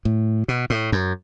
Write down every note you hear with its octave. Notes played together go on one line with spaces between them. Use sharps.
A2
B2
A2
F#2